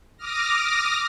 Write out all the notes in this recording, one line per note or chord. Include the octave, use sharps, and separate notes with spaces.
D6 D#6 F6 A#6